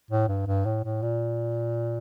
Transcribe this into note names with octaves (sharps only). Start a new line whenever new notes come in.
A2
G2
G2
A2
A2
A#2